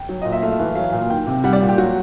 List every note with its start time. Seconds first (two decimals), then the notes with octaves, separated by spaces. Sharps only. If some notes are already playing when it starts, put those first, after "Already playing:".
Already playing: G5
0.09 F#3
0.22 A#2 D#5
0.32 E5
0.42 A3 F5
0.59 E3
0.75 F#3 F5
0.92 A#2
1.10 D#3 G5
1.27 C3
1.44 G3 F#5
1.53 D5
1.61 A#2
1.69 G4
1.78 F#3 F#4